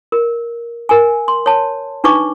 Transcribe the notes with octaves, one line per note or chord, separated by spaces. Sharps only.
A#4
A#4 G#5
C6
C#5 A5
D4 D#4 B4 C#6 D6